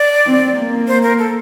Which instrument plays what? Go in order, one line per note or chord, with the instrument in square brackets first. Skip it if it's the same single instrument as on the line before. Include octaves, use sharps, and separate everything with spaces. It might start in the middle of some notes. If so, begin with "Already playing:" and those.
Already playing: [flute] D5
[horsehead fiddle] C4
A#3
[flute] C5
A#4
A4